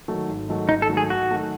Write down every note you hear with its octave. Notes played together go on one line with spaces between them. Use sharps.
D#3 F#3 A3
G#1
G#2 D#3 F#3 A3
G#1 D#4
A4
G#2 D#3 F#3 A3
G#4
G#1 F#4
D#3 F#3 A3